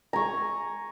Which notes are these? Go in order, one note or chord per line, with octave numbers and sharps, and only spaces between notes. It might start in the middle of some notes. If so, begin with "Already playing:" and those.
G#5 A#5 C#6